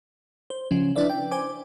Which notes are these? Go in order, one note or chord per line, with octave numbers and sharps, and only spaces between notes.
C5
C#3 F3 C#4
D4 E4 B4 D5 E5
G5
C5 G#5 D6